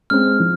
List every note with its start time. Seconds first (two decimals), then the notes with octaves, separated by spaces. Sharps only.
0.10 G#3 C4 F6
0.40 F3